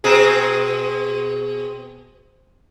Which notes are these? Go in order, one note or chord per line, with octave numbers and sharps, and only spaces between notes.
B2 C4 G#4